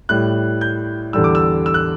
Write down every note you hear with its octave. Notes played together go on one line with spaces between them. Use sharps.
A2 G3 F#6
G6
E2 D3 G3 E6
D6
E6
E6
F#6